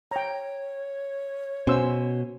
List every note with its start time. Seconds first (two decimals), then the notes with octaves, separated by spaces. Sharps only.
0.11 C#5 G5 A#5
1.67 B2 C#4 C5 E6